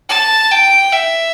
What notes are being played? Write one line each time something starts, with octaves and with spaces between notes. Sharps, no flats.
A5
G5
E5